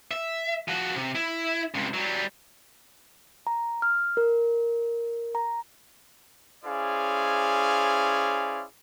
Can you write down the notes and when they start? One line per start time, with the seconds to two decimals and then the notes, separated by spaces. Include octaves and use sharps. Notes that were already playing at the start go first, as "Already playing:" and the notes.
0.11 E5
0.68 F3 F#4
0.96 C3
1.15 E4
1.75 C#2 C3
1.94 F#3 G3
3.47 A#5
3.82 F6
4.17 A#4
5.35 A#5
6.65 C#4 E4 G#4 C5 D5 F5